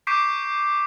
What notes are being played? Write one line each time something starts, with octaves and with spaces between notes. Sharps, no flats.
C#6 D6 G6 B6 C7 D7